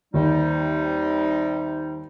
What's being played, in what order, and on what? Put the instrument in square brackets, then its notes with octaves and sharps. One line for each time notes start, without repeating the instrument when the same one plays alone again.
[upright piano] D#2 [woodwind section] C3 G3 D#4